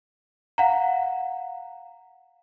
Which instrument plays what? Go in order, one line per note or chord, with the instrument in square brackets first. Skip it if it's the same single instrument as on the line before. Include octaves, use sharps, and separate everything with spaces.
[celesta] F5 F#5 A#5